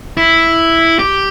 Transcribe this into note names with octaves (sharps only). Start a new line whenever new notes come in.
E4
G4